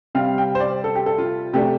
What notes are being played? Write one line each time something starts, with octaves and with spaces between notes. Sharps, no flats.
C3 G3 C4 F5
G5
C5
D5
A4
G4
A4
F4
C3 A3 D4 G4